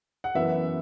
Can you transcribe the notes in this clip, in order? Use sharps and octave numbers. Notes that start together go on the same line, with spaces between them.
F#5
F#2 E3 B3 E5